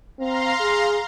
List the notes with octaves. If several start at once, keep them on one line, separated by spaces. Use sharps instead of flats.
C4 F5 A#5 C6
G#4